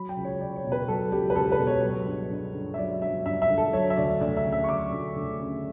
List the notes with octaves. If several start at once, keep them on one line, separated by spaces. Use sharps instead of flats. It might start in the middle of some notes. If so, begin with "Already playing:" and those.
Already playing: F#3 B5
G5
C#2
C#5
C#2 D5
C#5
B2
B4
F#3 A4
C#2 G4
B4
C#2 A4
B4
B2
C#5
F#3
G2
G2
D3
E5
F#3 D5
G2 E5
G2 E5
E5
D3
A4
F#3 C#5
E5
D2 D5
D2 D5
E5
C#3
E5
C#6
F#3 D6
D2
D2
C#3